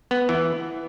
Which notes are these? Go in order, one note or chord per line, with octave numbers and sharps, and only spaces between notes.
B3
E3